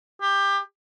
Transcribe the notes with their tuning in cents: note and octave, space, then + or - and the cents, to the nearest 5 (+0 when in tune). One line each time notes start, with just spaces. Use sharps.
G4 +20